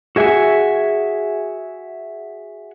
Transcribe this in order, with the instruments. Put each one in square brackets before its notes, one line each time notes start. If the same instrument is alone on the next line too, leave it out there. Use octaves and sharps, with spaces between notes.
[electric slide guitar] F#4 G#4 E5 F#5 G#5